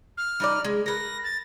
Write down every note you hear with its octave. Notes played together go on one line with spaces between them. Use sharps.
F6
G3 D#4 D5
G#3
A#4 B4 A#6
A6